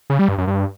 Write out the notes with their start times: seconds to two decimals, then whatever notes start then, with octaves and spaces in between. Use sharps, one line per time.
0.10 C#3
0.19 G3
0.29 G2
0.38 F#2
0.47 G2